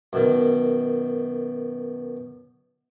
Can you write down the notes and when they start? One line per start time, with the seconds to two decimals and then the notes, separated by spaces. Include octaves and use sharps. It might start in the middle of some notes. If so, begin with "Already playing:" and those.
0.13 F#2 B2 D#3